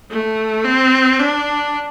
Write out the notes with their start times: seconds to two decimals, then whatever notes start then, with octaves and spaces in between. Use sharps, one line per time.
0.10 A3
0.65 C4
1.20 D4